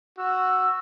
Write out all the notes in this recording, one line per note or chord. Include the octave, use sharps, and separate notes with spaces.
F#4 E6